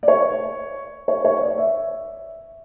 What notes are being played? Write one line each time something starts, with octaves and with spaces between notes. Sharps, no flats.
D5
C#5
C#5
C#5
D5
E5